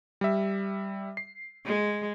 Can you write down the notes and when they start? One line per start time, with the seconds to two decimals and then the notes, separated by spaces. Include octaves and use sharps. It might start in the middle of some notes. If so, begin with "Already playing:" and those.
0.21 G3 E5
1.17 C7
1.65 G#3